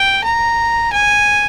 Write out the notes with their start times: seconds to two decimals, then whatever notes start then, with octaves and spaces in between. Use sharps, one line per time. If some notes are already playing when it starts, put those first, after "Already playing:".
Already playing: G5
0.24 A#5
0.93 G#5